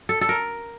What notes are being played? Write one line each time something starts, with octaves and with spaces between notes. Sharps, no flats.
A4
A4
A#4